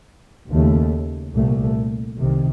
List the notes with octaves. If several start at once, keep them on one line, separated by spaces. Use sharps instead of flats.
D#2 C#3 A3
C2 A#2 A3
C2 C3 D#3